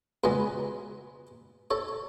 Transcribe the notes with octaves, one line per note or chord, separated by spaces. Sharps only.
C#2 B2 G#3 G#4 B4
A4 C#5